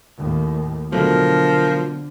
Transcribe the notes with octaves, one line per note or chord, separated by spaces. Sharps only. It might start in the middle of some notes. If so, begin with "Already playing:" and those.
D#2 A2
B2 D3 F3 F#3 A3 A#4